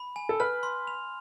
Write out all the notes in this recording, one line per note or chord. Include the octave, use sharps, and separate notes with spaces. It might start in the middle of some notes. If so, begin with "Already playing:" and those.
Already playing: B5
G#5
A4
B4 F6
C6
F7